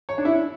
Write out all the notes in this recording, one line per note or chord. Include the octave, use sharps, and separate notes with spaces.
C#5
D4
E4